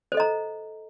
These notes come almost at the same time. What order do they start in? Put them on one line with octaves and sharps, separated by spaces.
C5 A4 D#5 A#5